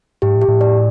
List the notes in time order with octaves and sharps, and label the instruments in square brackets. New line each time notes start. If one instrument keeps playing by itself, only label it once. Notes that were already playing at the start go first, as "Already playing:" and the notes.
[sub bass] G#2 [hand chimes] G4
[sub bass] A2
[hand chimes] G4
[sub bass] A2
[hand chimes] D5